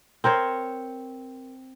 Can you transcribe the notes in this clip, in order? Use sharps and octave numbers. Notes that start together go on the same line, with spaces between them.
C4 A#4 C5 C#5